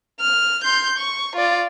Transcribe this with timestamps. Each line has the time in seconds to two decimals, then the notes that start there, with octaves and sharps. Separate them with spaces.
0.21 F6
0.64 C6 G6
0.98 C#6
1.36 F4 D5